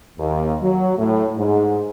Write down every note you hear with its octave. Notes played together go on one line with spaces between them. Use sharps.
D#2
F#3
A2
G#2